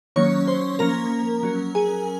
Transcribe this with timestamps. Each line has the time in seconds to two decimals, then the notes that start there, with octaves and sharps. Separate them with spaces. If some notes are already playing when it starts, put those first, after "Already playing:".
0.16 D#3 F#3 A#3 C#4 C#5 C#6
0.47 C5 C6
0.79 F3 A#3 C#4 A#4 A#5
1.43 F#3 C#4
1.75 G#4 G#5